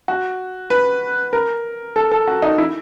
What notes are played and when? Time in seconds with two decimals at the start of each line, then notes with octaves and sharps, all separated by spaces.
0.08 F#4
0.70 B4
1.33 A#4
1.96 A4
2.12 A4
2.27 F#4
2.42 D#4
2.58 E4